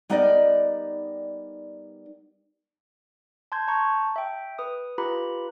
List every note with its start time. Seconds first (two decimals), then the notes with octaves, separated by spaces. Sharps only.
0.10 G3 B3 D#4 A#4 D5 D#5
3.52 A5 C6 G6 G#6
3.68 A5 A#5 C#6 G6
4.16 E5 G5
4.59 B4 D#6
4.98 F4 G4 B4 A#5 B5